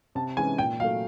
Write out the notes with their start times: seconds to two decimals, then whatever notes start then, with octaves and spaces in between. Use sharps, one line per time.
0.15 C3 A5
0.37 E3 G#3 C#4 G#5
0.58 A#2 G5
0.80 F#3 A3 F5